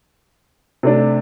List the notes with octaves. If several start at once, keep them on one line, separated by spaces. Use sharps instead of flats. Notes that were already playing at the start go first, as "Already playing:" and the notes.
C3 A3 D4